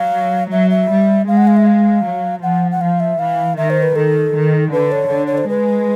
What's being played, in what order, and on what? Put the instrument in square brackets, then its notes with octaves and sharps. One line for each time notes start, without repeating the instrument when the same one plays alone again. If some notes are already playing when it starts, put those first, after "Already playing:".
Already playing: [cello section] F#3 [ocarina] F5
[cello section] F#3 [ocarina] E5
[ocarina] E5
[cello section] G3
[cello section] G#3 [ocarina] F5
[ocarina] F#5
F5
E5
F5
[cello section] F#3
[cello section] F3 [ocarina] F#5
[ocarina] F#5
[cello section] F3 [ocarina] F5
[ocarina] E5
[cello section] E3 [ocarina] F5
[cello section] D#3 [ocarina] E5
[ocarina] C5
B4
[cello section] D#3 [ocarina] A4
[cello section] D#3
[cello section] D3 [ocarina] B4
[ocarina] C#5
[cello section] D3
[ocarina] C#5
C5
[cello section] G#3 [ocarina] B4